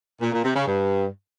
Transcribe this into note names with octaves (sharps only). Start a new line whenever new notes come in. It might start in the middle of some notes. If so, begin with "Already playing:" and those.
A#2
A#2
C3
C#3
G2